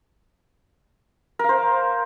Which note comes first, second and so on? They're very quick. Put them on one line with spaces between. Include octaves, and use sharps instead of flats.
A#4 F5 C5